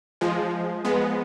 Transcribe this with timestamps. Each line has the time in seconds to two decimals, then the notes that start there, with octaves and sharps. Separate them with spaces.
0.21 F3 G#3
0.85 G#3 B3